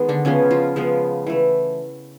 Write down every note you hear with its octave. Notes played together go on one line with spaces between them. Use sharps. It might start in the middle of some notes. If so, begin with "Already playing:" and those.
Already playing: D#3 G#3 B3
D3 D4
C#3 F3 G#3 B3 C#4
F3 F4
C#3 F3 G#3 B3
E3 A3